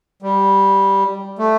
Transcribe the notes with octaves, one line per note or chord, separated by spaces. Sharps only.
G3
A3